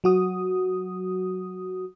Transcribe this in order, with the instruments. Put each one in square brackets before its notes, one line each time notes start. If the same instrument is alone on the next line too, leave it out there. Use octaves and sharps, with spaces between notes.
[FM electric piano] F#3 F#4 D#6